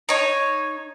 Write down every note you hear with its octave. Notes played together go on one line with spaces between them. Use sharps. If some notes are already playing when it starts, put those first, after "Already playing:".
D#4 C#5